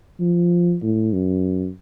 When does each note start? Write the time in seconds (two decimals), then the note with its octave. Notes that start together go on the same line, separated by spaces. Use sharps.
0.20 F3
0.82 A2
1.13 F#2